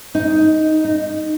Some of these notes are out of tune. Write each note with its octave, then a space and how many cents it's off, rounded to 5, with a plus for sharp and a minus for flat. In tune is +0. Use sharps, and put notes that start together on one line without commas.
D#4 +5
D#4 -15